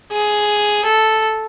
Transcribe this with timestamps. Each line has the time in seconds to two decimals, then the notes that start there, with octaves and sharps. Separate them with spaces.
0.12 G#4
0.85 A4